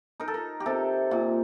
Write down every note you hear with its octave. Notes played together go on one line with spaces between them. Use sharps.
D#4 A#4
A4
A#4
G4
C3 A4
A#2